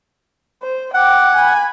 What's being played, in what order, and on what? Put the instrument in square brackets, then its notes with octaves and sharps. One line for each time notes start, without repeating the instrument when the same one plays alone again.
[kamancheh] C5
[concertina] F#5 [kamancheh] G5 D6
[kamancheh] G#5 B5